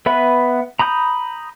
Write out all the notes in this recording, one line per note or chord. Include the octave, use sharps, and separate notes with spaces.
B3 B4 E5 B5
A#5 B5 D#6 G6